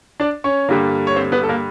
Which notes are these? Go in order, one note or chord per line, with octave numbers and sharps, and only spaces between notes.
D4 D5
C#4 C#5
G2 D3 G3 A#3 D4
C#5
C4 C5
B3 B4
A4
A#3 A#4